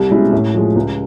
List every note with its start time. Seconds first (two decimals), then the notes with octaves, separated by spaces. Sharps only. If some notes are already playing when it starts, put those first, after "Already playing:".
Already playing: C2
0.10 B2 G#3 C#4 E4
0.33 A2
0.54 F3 G#3
0.75 C#2